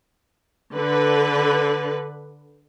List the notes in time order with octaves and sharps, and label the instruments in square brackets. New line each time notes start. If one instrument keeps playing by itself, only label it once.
[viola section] D3 B4